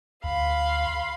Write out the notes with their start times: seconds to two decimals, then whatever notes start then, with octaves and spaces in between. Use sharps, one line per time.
0.24 D2 F5 B5 C6